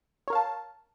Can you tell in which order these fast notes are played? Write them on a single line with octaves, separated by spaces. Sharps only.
C#5 A#4 F5 A5